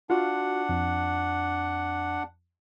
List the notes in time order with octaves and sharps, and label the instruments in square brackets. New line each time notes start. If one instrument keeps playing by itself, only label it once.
[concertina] D4 F#5 [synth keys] F4 F#4
[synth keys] F2